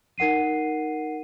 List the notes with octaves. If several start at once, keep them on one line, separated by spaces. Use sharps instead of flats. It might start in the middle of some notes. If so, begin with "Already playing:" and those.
D#4 A#4 F#5 C7 D#7